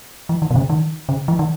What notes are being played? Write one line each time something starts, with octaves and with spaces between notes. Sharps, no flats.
E3
D#3
B2
C#3
D#3
C#3
E3
D#3